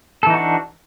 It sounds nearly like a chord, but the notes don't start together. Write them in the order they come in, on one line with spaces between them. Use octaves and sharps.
A4 E3 D#4 F#4 D4